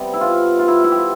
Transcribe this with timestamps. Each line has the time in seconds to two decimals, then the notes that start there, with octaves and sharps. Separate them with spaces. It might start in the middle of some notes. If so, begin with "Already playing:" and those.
Already playing: C3 G3 B3
0.14 E4
0.21 F4
0.59 F4
0.68 E4
0.84 E4
0.92 G4
0.97 F4